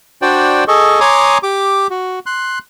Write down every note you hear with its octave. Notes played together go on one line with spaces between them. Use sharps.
D4 F#4 C5 D5 G5
G#4 A4 D#5 C#6
C#5 G#5 A#5 C6 D6 D#6
G4 D6
F#4
C6 F#6